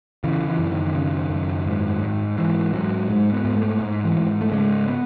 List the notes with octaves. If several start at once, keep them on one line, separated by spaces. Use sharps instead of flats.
C#3 E3
E3
F#2
D#3
C#3
F#2
G#2
G#2
G#2 E3
G#2 F#3
G#2 G#3
B3
G#2
A3
G#2
E3
G#2
A3
C#3 G#3
B3